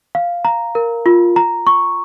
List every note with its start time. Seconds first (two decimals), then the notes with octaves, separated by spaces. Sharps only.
0.15 F5
0.45 A#5
0.75 A#4
1.06 F4
1.36 A#5
1.67 C#6